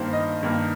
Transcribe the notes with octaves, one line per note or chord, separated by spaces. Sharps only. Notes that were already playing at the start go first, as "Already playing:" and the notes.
Already playing: G2 D#3 A#3 C5
D#5
G2 D#3 A#3